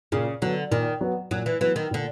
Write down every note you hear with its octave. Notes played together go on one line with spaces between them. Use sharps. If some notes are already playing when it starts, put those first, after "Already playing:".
A#2 C#3
D3 F#3 B3
A#2 D#3
F#3 B3
A#2 F#3
E3
E3 F#3 B3
D#3
A#2 D3